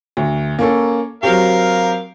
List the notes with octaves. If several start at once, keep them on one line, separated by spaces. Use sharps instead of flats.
D2
A#3 C#4 A4
F#3 C4 G4 A#4 F5